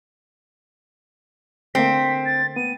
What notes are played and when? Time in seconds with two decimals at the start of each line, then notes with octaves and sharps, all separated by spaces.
1.75 D3 A3 A#3 C4 B6
2.26 A6
2.56 B3 D#7